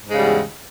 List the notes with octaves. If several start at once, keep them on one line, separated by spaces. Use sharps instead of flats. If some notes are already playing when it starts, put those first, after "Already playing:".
E2 G#2 C#3 G3 G#3